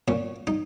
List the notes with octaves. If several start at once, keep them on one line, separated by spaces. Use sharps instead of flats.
A#2 C#4
D#4